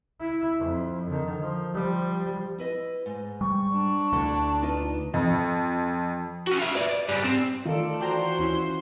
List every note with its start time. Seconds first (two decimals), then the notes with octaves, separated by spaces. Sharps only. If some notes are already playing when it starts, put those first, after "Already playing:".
0.20 E4
0.59 F2
1.10 D3 D#3
1.42 F3
1.73 F3 G3
2.58 E4 B4 D#5
3.06 G#2
3.41 G3 C#6
3.73 D4
4.13 D2 D3 E4 A4
4.62 D#4 F4 B4
5.14 F2
6.47 C#4 F#4
6.59 F4 E5
6.75 B4 D5
6.89 D5
7.09 G#2 G3
7.24 C4
7.66 D#3 A3 F4 A4 D5
8.00 E3 F#4 C5 D5 G5 A#5 C6
8.39 D#2 C#4 E4